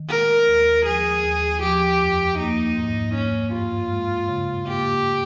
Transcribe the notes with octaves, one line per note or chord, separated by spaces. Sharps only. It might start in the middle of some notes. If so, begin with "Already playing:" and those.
Already playing: D#3
G#3 A#4
D#2
F3 G#4
D#2
F3 G4
F2
A#3 D#4
G#2
A#3 C#4
G2 F4
G#3
C#3
A#3 G4